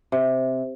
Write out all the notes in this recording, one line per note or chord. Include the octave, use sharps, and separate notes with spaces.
C3